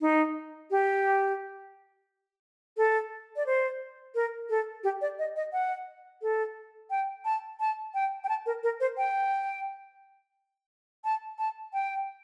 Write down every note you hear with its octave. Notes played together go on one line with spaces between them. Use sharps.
D#4
G4
A4
D5
C5
A#4
A4
G4
D5
D#5
D#5
F#5
A4
G5
A5
A5
G5
G5
A5
A#4
A#4
C5
G5
A5
A5
G5